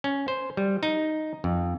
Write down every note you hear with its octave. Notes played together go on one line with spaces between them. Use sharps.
C#4
C5
G3
D#4
F2